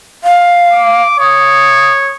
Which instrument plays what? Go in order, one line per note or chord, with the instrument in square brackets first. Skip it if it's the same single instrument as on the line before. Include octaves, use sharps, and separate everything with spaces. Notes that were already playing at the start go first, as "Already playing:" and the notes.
[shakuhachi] F5
[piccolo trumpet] D6
[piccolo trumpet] C#5 [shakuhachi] D#6